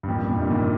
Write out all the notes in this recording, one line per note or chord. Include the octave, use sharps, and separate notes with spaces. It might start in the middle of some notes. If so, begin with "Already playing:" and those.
G2
F2 A#2
G2
F2 A#2
G2 C3
A#2 D#3